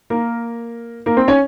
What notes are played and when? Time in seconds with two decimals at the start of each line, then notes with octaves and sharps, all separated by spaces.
0.10 A#3 A#4
1.06 A#3 A#4
1.17 C4 C5
1.28 C#4 C#5